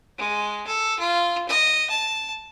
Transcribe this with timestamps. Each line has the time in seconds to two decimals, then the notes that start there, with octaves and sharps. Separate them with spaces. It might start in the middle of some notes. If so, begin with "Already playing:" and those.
0.18 G#3
0.67 A4
0.99 F4
1.48 D#5
1.90 A5